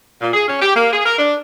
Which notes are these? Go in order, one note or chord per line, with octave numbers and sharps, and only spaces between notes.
A#2
G#4
C#4
G4
A#3
G#4
A#4
D4